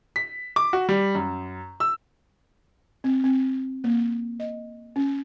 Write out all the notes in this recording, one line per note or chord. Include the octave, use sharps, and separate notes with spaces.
B6
D6
F#4
G3
F#2
E6
C4
C4
A#3
D#5
C#4